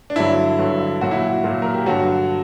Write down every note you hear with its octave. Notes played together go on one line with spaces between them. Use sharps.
D4
G2 D3 F#3 E4
G2 D3 F#3
A#2 F#3 F#4
E4
F#4
A#2 F#3
A#4
G4
G2 D3 F#3 F#4